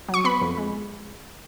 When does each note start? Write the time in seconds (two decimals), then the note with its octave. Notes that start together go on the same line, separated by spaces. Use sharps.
0.09 F#3
0.14 C#6
0.24 B3 B5
0.41 F2
0.57 G#3